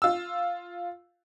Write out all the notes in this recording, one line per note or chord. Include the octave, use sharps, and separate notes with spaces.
F4 E6